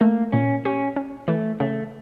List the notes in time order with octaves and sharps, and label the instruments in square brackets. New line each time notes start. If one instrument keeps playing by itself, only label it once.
[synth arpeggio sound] A3 [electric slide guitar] A#3
[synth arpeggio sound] A#2 [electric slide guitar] C#4
[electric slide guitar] C#4 [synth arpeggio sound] G4
[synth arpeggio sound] C#4
[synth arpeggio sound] E3 [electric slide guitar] A3
[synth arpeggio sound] C#3 [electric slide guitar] A3